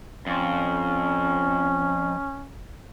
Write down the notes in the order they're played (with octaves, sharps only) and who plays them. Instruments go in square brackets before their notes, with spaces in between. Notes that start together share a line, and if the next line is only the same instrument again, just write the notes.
[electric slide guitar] F2 [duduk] C#4